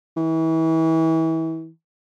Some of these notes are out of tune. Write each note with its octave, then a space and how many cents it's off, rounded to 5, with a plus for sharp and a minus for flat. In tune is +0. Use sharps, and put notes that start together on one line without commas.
E3 -30